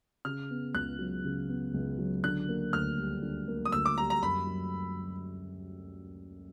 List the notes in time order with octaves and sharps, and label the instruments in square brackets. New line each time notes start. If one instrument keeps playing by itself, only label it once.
[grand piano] C#3 [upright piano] F6
[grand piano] B3
[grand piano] C#2 [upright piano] F#6
[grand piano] F#3
C#3
B3
C#2
F#3
[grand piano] D3 [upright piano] F#6
[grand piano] A#3
[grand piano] D2 [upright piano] F6
[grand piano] G3
D3
A#3
[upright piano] D#6
[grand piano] D2 [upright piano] E6
[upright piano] D6
[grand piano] G3 [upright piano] A#5
[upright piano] A#5
[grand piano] F#2 [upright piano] B5
[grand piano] F#3